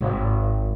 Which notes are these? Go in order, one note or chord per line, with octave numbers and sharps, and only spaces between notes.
G#1